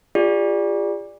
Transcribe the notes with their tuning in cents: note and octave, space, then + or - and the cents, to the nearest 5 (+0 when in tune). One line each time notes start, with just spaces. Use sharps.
F4 +0 G#4 -40 D5 +0